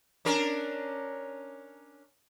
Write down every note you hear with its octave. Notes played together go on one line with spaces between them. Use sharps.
C#4 D4 A#4